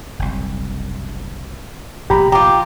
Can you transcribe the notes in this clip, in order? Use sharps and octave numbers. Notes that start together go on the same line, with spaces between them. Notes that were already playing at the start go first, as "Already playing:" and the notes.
F#1 C2
F1 A#1 G4 A#5 B5
F4 G4 A#5 D6